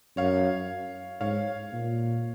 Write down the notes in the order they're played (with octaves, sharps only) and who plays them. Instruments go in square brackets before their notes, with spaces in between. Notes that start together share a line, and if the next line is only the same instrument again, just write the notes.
[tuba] F#2 [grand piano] C#5 F5
[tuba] G#2 [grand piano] C#5 F5
[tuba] A#2